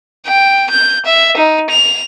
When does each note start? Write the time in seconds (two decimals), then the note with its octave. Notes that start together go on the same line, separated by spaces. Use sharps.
0.27 G5
0.70 G6
1.06 E5
1.37 D#4
1.70 F7